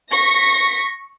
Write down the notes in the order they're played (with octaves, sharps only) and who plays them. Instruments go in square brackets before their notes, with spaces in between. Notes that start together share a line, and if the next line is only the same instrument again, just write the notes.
[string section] C#6 A#6 B6